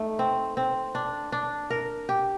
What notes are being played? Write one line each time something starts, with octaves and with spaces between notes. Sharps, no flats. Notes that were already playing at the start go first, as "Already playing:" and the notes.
Already playing: A3 D#4
C4
C4
D4
D4
A#4
G4